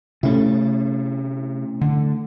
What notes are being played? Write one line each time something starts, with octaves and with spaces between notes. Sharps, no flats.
C3 A3 C#4 E4
D3